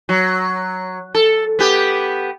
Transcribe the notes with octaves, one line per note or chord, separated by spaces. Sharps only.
F#3
A4
B3 G4